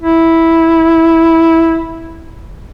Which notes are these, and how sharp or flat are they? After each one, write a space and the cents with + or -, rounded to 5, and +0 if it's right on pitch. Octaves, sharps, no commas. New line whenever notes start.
E4 -5